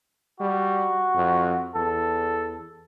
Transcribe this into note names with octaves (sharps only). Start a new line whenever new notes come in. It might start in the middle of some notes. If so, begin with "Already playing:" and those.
G3 F#4
F2
E2 A4